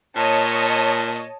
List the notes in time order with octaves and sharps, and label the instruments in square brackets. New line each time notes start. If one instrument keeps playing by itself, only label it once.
[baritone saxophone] A#2 [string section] C#5 D#5 A5